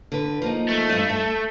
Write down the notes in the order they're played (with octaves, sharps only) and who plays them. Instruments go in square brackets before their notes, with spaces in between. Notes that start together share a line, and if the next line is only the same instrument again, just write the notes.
[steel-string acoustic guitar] D3 B4
F3 A#3 D#4
[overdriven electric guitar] A3
[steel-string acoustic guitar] G2 D#5
A4